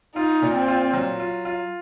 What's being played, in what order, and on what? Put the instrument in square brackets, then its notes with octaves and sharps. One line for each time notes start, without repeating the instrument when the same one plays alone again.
[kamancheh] D#4 [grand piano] F4
[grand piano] A#2
[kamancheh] C4
[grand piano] F4
F#3
F4
F4